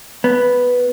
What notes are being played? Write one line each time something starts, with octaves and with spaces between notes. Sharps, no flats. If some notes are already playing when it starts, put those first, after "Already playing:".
B3